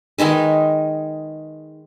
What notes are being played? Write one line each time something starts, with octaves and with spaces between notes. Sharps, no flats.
D#3 G#3 D#4 B4